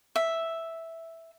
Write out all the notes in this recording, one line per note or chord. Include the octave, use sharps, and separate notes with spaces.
E5